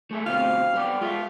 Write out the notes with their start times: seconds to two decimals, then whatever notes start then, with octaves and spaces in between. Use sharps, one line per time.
0.11 A3 G#4 E5
0.26 D2 B2 C4 F5
0.74 G3 B3 G4
1.01 G#3 F4 D#5 E5